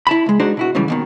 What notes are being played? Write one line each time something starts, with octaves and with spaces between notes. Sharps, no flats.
E4 A5 B5
C#2 G#3
G#3 D4 D#4 F#4 C5
B2 E4 F#4
G#2 C#3 E3 G3
D#2 B2 D#3